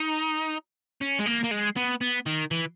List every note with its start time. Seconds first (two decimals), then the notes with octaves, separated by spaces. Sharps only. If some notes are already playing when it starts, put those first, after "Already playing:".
Already playing: D#4
1.01 C#4
1.19 G#3
1.26 A#3
1.44 A#3
1.51 G#3
1.77 B3
2.01 B3
2.26 D#3
2.51 E3